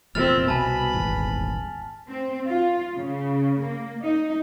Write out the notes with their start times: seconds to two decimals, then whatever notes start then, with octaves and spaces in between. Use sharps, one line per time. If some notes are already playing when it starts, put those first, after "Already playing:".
0.15 F1 E2 A#2 C4 E5 F6 A6 F7
0.48 C2 B2 B4 G#5 A5 B5
0.92 D#1 G#1 E2
2.08 C4
2.46 F4
2.97 C#3
3.62 A#3
4.02 D#4